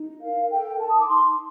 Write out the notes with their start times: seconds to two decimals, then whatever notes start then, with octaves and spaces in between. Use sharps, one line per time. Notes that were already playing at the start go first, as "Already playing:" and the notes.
Already playing: D#4
0.21 A#4 F5
0.51 A4 G5
0.79 D#4 A5
0.89 D#6
0.99 D6
1.07 D#4 C6